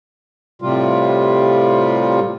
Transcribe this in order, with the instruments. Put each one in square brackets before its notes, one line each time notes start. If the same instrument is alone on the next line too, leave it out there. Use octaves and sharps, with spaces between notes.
[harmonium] A2 C3 G3 F4